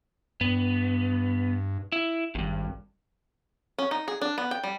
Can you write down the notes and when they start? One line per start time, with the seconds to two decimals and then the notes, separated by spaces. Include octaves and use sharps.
0.41 G2 B3
1.92 E4
2.35 G#1 E2 G2
3.78 C#4
3.91 D#4
4.08 G#4
4.22 D4
4.38 B3
4.51 G5
4.64 G3